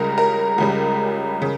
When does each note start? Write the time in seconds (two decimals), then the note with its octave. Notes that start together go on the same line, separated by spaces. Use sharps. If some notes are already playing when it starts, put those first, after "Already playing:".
Already playing: C#2 C#3 G3 A#4
0.18 A#4
0.58 C#2 C#3 G3
1.42 C#3